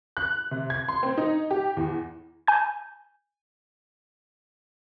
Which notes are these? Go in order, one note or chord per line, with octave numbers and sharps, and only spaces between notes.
F#6
C3
G#6
C6
C4
D#4
G4
E2
G#5 G6